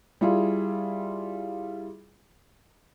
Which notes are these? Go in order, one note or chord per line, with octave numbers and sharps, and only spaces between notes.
G3 E4 F4 G#4